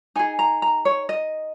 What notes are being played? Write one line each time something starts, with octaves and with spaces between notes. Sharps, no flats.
D#4 G#4 G#5
A#5
A#5
C#5
D#5